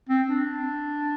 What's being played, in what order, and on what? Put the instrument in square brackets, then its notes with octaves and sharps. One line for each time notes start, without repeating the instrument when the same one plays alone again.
[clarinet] C4
D4